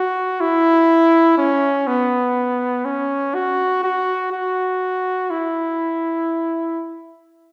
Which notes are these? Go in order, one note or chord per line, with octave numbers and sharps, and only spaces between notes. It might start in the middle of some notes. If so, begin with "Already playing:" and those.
Already playing: F#4
E4
C#4
B3
C#4
F#4
F#4
F#4
E4